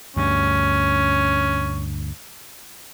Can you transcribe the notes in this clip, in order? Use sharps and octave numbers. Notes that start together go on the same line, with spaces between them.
D2 G2 C#4